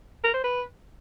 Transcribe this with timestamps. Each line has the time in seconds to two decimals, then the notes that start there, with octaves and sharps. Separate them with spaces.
0.24 A#4
0.34 C5
0.44 B4